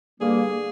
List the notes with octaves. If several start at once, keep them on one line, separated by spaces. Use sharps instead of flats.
G2 D3 G3 A#3 G#4